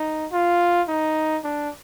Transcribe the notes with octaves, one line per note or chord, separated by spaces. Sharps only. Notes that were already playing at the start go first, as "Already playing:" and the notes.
Already playing: D#4
F4
D#4
D4